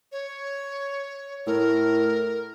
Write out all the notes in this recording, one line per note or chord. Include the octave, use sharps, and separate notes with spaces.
C#5
A2 A#4